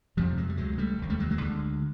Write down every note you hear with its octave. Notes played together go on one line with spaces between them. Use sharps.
F1 F2 C3 F3 G3
F#3 G#3
G3
C#2 C3 F#3 G#3
G3 A3
F1 D#2 D3
G3 A3
F#3 G#3
F#3 G#3
D2 D3